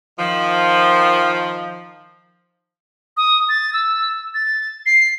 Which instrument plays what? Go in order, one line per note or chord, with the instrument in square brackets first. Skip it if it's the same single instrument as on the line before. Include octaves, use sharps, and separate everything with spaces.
[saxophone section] D#3 F3
[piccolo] D#6
A6
E6
A6
C7